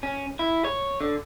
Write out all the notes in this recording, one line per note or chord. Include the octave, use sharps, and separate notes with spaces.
C#4
E4
C#5
D3